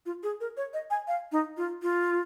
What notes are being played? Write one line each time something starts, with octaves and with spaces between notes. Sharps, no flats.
F4
G#4
A#4
C#5
D#5
G#5
F5
D#4
F4
F4